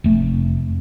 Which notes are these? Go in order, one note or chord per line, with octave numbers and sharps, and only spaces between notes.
F1 A3